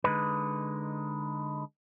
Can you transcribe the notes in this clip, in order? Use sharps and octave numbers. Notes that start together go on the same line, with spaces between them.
D3 G#3 D#4 B4